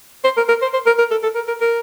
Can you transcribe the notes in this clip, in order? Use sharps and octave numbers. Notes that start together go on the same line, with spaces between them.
C5
A#4
A#4
C5
C5
A#4
A#4
A4
A4
A#4
A#4
A#4